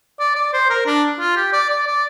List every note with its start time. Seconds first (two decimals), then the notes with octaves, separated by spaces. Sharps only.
0.20 D5
0.36 D5
0.53 C5
0.70 A#4
0.86 D4
1.20 F4
1.36 G4
1.53 D5
1.70 D5
1.87 D5